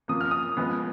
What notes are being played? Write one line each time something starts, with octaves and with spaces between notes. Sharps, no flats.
C#3 F3 A#3 D#6
F6
D#6
C#3 F3 G#3 B3